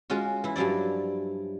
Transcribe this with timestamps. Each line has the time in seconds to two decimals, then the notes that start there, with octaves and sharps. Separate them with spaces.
0.10 G#3 C#4 F4 F#4
0.44 E3 E4
0.56 G2 F3 F#3 E4 D5